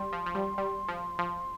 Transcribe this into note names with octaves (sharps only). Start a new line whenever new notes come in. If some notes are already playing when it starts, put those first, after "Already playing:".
Already playing: G3 C6
F3
F3
G3
G3
F3
F3